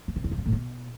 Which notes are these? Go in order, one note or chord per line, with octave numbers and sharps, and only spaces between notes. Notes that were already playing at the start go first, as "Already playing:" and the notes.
D#3
C3
E2
F#2
G2
A2
B2